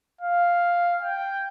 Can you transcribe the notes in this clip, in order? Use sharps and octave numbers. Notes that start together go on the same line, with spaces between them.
F5
G5